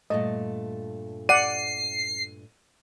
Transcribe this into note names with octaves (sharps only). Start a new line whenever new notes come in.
G2 A#2 A3 D#5
D5 F#5 C7 D#7